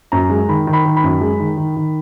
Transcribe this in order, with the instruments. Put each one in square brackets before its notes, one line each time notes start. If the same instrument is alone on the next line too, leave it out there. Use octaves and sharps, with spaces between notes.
[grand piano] F#2 A#5
G#3
D#3 B5
D#3
B5
D#3
B5
F#2
G#3
D#3
D#3
D#3